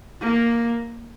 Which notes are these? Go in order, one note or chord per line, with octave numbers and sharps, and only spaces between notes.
A#3